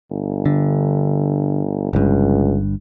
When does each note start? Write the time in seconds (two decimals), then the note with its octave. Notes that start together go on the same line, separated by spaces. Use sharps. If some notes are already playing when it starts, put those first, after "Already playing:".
0.10 G1
0.46 D3
1.93 G1 C#2 G2